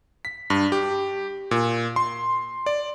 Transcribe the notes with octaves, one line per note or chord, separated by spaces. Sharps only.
B6
G2
G4
A#2
C6
D5